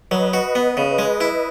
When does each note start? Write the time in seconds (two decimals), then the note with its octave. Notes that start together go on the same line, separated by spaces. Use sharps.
0.11 F#3 B4 D#5
0.33 F#4
0.55 B3
0.77 C#3
0.99 G#3
1.21 E4